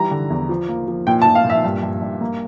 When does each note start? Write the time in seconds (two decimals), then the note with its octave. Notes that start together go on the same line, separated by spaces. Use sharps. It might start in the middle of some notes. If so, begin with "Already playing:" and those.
Already playing: E3 G3 A#5
0.11 D3
0.30 E2
0.49 F3
0.69 A#3
0.88 F3
1.07 A#2 G5
1.22 A5
1.26 A#2
1.35 F5
1.44 A#2
1.50 E5
1.64 G2
1.83 G2
2.02 G2
2.21 A#3